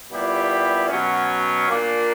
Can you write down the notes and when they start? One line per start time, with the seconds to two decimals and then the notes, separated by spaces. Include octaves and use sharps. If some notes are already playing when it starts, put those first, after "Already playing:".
0.10 A#2 G3 B3 E4 G4
0.89 B2 F#3 C#4
1.68 A#2 A#3 D4